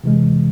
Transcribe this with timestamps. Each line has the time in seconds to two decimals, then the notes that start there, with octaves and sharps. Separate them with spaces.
0.04 C3 E3 G#3